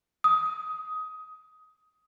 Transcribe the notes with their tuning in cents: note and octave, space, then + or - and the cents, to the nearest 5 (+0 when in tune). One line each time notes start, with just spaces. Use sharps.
D#6 +15